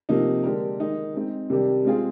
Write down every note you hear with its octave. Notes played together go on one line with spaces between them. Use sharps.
C3 F3 A#3 D#4
D3 G#3 D4 G4 A#4
D#3 G#3 D#4
G#3 C4 D#4
C3 D#3 G3 D4 G4
G#3 C4 F4 G#4